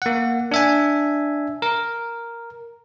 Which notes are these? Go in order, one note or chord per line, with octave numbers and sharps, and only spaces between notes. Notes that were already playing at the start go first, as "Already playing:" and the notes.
A#3 F#5
D4 E5 G#5
A#4